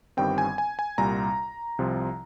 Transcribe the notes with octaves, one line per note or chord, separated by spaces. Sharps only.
G1 G2 D#3 G3 C4 G5
G#5
G#5
G#5
C2 A#2 G3 A#5
C2 C3 F3